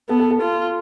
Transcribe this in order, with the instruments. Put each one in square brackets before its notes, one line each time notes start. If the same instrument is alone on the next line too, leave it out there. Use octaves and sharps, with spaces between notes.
[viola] B3 [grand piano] A4
[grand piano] A4
A4
[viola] F4